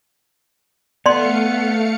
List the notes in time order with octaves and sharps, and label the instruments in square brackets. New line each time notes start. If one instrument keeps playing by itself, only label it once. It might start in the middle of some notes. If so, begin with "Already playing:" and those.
[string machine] A3 F5 C#7 [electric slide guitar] B3 [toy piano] D5 C6